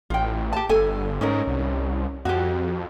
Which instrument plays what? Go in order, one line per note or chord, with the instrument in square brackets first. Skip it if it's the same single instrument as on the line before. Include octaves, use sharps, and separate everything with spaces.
[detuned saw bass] A1 [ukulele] F4 G5
[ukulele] G4 A5
[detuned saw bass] G1 [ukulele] A4 G#5
[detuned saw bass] G#2 [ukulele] C#4 D#4 A#4
[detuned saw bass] C2
[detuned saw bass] F2 [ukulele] F#4 G4